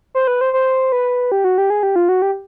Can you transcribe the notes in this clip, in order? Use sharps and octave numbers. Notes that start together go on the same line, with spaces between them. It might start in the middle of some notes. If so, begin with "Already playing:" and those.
C5
B4
C5
C5
B4
G4
F#4
G4
G#4
G4
F4
F#4
G4